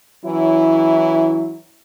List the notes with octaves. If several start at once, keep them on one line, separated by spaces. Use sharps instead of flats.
E3 F#3 C#4 E4